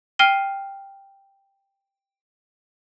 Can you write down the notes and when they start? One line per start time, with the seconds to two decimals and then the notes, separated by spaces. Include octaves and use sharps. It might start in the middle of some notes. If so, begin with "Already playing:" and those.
0.19 G5 F6 C7 D#7 G7